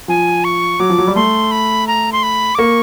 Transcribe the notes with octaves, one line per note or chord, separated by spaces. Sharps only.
F3 G#5
C#6
F#3 D6
F3
F#3
G3
A3 C6
B5
A#5
C6
B5
D6
A#3 C#6